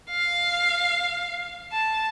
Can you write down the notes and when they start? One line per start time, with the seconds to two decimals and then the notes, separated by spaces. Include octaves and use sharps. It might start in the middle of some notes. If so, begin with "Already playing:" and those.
0.11 F5
1.72 A5